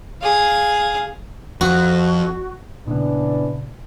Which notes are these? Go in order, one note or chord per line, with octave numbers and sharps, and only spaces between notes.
G#4 F5
F2 F#4
A#2 C#3 E3 B3 D4